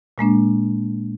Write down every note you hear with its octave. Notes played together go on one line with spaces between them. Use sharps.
A#2 G#3 A#3 D4